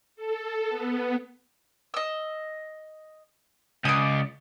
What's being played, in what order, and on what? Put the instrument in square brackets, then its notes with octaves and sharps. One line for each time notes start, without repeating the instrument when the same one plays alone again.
[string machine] A4
B3
[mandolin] D#5 E6
[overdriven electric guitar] C#2 [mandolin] D5 D#6